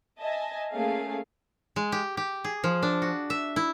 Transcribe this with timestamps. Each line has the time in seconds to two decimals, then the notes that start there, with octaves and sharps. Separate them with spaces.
0.19 D#5 E5 G#5 A5
0.70 A3 A#3 C#4 G#4 F5
1.76 G#3
1.92 G4
2.17 G4
2.44 G#4
2.64 F3
2.83 D4
3.02 F#4
3.30 E5
3.56 E4